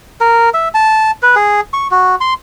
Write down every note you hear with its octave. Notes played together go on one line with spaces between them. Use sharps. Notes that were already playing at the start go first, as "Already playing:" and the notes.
A#4
E5
A5
B4
G#4
C#6
F#4
C6